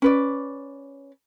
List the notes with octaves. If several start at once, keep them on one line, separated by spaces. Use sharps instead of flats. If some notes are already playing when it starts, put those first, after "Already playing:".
C#4 B4 D5